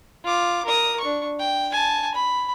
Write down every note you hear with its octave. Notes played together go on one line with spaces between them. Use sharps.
F4 D6
A#4 D#6
D4 C#6
G5
G#5 A5
B5